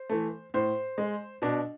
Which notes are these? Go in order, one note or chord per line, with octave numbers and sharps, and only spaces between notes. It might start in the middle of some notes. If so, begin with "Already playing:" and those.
Already playing: C5
E3 A3
A2 C5
G#3
B2 D4